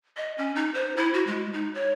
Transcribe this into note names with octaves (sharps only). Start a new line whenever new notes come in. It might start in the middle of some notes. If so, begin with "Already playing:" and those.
D#5
C#4
D#4
C5
E4
F#4
G#3
D#4
C#5